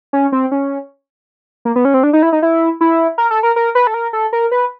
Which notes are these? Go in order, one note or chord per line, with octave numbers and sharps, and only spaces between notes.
C#4
C4
C#4
A#3
B3
C#4
C4
D4
D#4
E4
D#4
E4
E4
A#4
A4
A#4
A#4
B4
A4
A#4
A4
A#4
B4